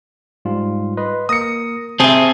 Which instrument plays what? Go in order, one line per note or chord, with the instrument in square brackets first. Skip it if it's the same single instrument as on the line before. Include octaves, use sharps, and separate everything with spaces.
[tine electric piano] G#2 G3 F4
B4 D#5 C6
[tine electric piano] A#3 A#4 A#6 [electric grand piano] D#6 C#7
[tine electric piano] C3 [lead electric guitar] C4 G#4 [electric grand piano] E5 A5